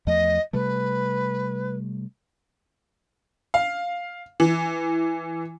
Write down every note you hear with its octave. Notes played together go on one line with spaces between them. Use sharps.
E2 F3 A3 D#5
C3 G3 A3 B4
F5
E3